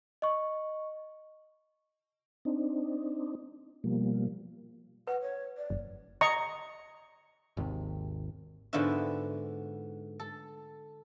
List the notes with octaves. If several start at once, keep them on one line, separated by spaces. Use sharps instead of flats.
D#5 C#6
C4 D4 D#4
B2 F3 G3 A#3
B4 F#5
C#5
D5
F#1
D#5 A#5 C#6
G#1 D#2 C3
G#2 D3 B3 F4 F#4 E5
A4